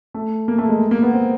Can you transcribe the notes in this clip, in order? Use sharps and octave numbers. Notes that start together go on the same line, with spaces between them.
A3
A#3
A3
G#3
A#3
B3
C4